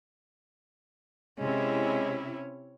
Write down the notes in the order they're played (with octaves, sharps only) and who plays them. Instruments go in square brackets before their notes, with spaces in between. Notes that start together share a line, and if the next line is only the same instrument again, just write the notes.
[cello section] C3 E4 [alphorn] G#3 [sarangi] C#4